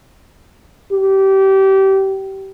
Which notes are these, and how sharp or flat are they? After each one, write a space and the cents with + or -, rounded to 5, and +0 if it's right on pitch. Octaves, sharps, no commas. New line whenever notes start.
G4 -25